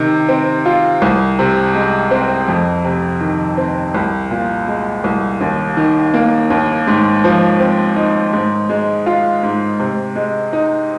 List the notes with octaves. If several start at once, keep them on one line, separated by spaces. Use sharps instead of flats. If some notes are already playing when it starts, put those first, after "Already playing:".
Already playing: C3 D#3
C4
F4
C2
C3
G#3
C4
F2
C3
D#3
C4
C2
A#2
G#3
C2
D#2
D#3
A#3
D#2
G#2
F3
C4
D#4
G#2
G#3
F4
G#2
C3
G#3
D#4